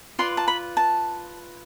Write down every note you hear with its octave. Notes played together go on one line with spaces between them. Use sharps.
F4 B4 D5 C6
A5
B5
A5